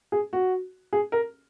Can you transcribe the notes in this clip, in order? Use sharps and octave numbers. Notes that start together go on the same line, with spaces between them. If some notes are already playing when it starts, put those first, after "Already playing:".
G#4
F#4
G#4
A#4